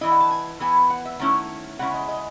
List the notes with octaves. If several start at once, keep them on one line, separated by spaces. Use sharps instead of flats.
E3 A3 E4 D#5
F#5
A5
G#5
E3 B3 E4 G#5
F#5
E5
D#3 A3 C#4 E4 F#5
C#3 G#3 C#4 E4 F#5
D#5
D#5